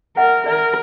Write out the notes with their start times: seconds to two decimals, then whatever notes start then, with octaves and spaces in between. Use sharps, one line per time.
0.17 A#4 E5 F#5
0.46 A#4 D5 E5